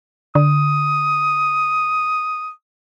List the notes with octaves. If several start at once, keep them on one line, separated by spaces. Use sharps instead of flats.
D3 D#6